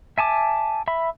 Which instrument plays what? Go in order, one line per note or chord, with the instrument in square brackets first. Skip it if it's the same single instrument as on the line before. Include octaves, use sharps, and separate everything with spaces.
[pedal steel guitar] E5 G#5 A5 D6
E5 B5